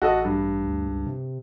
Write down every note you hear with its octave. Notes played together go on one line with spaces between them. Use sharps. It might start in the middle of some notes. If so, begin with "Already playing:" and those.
A1 F#4 A4 D#5
G2
D2
C#2
C3